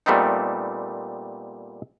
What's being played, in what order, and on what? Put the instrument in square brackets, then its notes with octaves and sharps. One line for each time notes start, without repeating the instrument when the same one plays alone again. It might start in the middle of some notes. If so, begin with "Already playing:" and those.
[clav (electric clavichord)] A#2 G3 A3 B3 C4 D#4